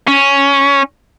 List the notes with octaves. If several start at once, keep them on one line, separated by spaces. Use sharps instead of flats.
C#4